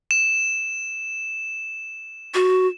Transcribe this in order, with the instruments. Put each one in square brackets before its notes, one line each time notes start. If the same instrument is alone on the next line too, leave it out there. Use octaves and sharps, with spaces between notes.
[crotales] E7
[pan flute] F#4